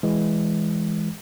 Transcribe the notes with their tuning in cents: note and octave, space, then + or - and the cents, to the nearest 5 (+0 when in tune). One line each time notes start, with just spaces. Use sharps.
E3 +0 G#3 +0